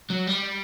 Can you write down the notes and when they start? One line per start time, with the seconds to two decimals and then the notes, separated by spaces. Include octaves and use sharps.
0.10 F#3
0.27 G3